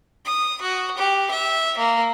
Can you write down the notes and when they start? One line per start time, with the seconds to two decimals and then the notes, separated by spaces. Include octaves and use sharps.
0.25 D#6
0.62 F#4
0.97 G4
1.31 E5
1.78 A#3